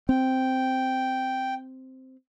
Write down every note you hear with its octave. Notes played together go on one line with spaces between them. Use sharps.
C4 G5